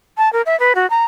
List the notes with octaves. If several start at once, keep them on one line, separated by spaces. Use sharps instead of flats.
A5
A#4
E5
B4
F#4
A#5